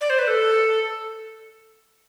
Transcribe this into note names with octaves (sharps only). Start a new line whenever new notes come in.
D5
C5
B4
A4